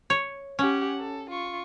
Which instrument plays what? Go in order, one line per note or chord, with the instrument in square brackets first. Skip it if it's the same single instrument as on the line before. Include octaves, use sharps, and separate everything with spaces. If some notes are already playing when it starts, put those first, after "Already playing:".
[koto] C#5
[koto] C#4 [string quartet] G4 F#5 G#5
[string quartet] A4
F4 C#6